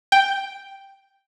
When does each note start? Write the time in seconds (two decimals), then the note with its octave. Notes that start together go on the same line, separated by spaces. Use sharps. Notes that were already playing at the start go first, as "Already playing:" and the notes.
0.12 G5